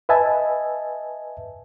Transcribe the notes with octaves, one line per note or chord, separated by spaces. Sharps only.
B4 D#5 E5 G#5 A5